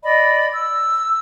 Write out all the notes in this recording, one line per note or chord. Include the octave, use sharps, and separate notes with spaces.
D5 D#5 B5
E6